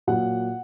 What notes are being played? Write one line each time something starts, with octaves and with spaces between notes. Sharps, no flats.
A#2 F#3 F#5